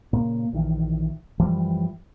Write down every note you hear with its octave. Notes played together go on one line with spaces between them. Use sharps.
A#2 C#3 A#3
A#1 D#3 E3
F#2 E3 F3 G3